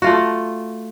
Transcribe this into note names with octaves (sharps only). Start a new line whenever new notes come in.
A3 F4 F#4